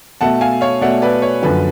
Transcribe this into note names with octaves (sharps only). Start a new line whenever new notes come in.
B2 A3 F#5 A5
F5 G#5
C#5 F5
B2 A3 D5 F#5
B4 D5
C#5
F#2 D3 F3 B4